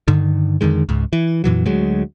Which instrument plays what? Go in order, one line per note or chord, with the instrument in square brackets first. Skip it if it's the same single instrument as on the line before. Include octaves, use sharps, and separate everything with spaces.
[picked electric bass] G2 D3 D#3
F2 D3 D#3 G#3
C#2 G#2
E3
F2 A#2 E3 F#3
D2 F#3 G#3